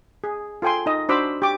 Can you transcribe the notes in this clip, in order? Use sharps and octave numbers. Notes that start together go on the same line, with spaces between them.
G#4
F4 A4 G5 G#5 C6
D#4 D#5
D4 F#4 C5 B5 D6 E6
G4 D6